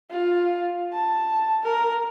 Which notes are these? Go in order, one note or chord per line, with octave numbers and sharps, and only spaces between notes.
F4
A5
A#4